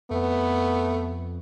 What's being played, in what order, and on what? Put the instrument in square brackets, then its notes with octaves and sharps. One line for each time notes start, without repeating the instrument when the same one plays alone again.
[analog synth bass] F2 [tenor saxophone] A3 [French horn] B3